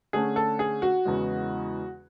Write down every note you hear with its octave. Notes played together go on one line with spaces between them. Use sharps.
D3 A3 C#4 G#4
A4
G#4
F#4
E2 C#3 E3 G#3